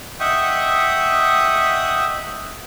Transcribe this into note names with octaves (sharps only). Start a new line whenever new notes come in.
D#5 E5 F#5 G5 C#6 D#6